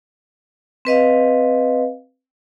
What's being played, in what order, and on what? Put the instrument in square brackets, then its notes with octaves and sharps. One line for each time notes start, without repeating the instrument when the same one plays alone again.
[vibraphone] C4 B4 D#5 F5